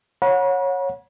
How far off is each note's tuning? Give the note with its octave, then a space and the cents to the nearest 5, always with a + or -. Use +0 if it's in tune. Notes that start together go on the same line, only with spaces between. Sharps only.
C#5 -10 F#5 -30 B5 -45